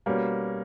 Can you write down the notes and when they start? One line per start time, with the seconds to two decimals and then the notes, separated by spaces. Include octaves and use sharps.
0.06 B2 G3 A#3 C#4